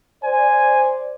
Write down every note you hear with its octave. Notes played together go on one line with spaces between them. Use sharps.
C5 D5 G#5